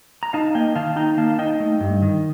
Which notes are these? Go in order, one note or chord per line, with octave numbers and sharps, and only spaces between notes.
A#5
D#4 F5 A5
A#3 D#5 G5
D#3 F5 A5
D#4 G5 A#5
A#3 F5 A5
A5
D#4 D#5 G5
A3
G2
D#3